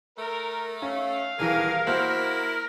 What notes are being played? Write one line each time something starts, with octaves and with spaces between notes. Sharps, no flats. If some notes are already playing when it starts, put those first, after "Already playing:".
A3 A#4
C#4 F5
D#1 E3 G#4 A#4
A#3 E4 F#4 C5